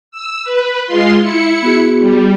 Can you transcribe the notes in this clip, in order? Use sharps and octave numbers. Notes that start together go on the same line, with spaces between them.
E6
B4
G#3 F4 C6
E4 C#7
B3 F#4 G#4
G3